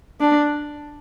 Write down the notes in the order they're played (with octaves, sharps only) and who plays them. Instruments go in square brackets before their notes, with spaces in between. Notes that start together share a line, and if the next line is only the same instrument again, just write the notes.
[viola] D4